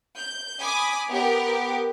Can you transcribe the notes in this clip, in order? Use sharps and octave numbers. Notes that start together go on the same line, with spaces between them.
G6
G#5 B5 D6 D#6
B3 G4 A#4